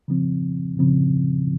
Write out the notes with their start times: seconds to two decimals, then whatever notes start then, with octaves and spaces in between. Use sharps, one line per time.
0.08 C#3 F3 C4
0.79 C#3 F3 C4